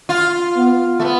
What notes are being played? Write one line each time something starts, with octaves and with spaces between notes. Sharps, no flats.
F4
B3
A3
B3